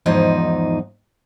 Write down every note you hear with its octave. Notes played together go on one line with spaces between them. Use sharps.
E2 G#2 F3 D#4